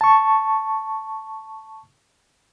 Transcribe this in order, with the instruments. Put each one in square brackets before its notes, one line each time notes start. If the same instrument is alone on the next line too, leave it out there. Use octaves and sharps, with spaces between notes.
[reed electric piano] A5 C#6